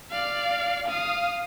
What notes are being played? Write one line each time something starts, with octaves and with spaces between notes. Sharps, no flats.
D5 F5
F5 D#6